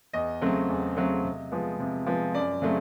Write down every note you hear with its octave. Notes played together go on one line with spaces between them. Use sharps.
E2 D#5
C#3 F#3 A3 C4
E2
C#3 F#3 A3 C4
C3
F3 G#3 B3
C3
F3 G#3 B3
F#2 D5
C#3 F#3 A3 C4